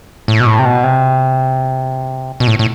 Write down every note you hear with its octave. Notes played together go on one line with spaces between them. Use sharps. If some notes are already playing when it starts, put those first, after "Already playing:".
A2
B2
A2
C3
B2
C3
B2
A2
A2